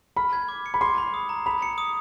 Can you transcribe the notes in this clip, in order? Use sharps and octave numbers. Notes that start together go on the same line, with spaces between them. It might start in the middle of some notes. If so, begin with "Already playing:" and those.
B5 F6
G#6
D6
C#7
B5
C6 D6
B5
D#6
A#5
B5 F7
C#7
D#6